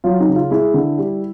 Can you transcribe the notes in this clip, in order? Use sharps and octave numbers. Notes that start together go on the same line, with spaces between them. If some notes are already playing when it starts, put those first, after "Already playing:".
F#3 F4
D#4
C#3
F4
G#3 E4
D3
G3